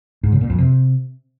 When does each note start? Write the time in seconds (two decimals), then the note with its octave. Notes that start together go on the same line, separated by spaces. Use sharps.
0.23 G#2
0.32 C#3
0.41 A#2
0.50 F2
0.58 C3